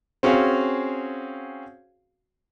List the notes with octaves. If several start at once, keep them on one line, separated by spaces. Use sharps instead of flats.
C4 C#4 F#4 G#4 F5